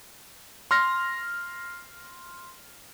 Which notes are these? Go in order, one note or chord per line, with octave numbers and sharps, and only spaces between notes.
C6 F6 A#6